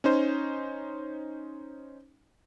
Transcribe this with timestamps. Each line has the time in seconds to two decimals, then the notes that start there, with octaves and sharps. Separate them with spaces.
0.04 C#4 D#4 C5